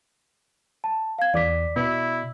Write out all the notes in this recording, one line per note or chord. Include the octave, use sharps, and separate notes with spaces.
A5
F5 G#6
E2 D5 D6 B6
B2 E4